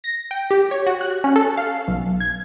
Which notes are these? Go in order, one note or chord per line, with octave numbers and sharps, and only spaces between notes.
A#6
G5
G4
C#5
F#4
F#6
C#4
A4
F5
B1
G#6